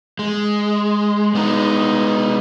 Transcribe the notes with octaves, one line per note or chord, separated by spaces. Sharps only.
G#3
G#3 B3 D#4